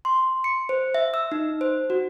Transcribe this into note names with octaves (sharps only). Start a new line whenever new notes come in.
C6
C#7
C5
E5
E6
D#4
C5
F#4